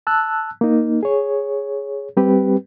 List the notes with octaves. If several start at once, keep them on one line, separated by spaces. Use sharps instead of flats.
A5 E6 F#6
A#3 D#4
G#4 C#5
G3 C4 G4 B4